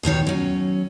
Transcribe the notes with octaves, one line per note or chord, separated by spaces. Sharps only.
D#2 B2 D#3 C#5
F#3 C#4